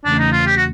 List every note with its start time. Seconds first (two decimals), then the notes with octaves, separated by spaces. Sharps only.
0.05 E2 C#3 E3 A3 C#4 D4
0.19 D#4
0.32 F4
0.46 G4
0.57 F#4